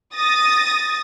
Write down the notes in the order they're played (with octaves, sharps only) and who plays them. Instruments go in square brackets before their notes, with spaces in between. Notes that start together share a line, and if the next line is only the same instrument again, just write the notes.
[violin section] D#6 A6 A#6